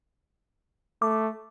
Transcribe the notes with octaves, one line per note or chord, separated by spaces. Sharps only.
A3 D6